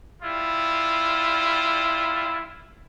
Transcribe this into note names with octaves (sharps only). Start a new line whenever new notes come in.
G3 E4 F4